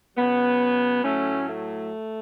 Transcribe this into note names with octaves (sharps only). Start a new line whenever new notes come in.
C#3 F#3 B3
A2 F#3 A3 C#4
A3